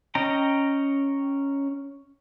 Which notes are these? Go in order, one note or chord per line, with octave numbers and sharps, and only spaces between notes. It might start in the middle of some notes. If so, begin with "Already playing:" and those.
C#4 D#5 G5 A#5